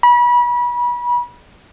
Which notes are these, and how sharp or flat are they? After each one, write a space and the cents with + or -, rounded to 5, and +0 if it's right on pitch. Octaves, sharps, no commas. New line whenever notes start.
B5 -30